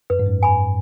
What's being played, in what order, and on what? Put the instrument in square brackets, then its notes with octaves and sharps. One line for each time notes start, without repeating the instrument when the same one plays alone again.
[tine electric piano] F#2 [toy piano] B4
[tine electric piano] G#2
F#2
[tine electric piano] F#2 [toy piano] G#5 B5